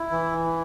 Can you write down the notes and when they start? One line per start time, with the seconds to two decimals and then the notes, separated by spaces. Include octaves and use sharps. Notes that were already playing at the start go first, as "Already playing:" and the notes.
Already playing: E4
0.11 E3